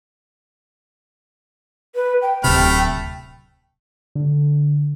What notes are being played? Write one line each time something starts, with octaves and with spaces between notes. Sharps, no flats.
B4
G5
D1 C3 A3 B5 F6
D3